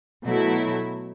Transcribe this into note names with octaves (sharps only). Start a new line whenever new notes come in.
B2 F#3 A3 E4